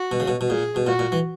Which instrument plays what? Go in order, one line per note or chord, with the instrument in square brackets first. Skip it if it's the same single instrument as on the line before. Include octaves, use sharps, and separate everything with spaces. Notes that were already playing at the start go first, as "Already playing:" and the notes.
Already playing: [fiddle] F#4
[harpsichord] B2
C#3
B2
B2
[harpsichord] A#2 [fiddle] G#4
[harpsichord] B2
[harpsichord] A#2 [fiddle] F#4
[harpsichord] A#2
E3